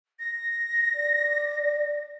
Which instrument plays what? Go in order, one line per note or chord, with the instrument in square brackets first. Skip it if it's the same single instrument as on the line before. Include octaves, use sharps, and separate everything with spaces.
[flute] A#6
[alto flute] D5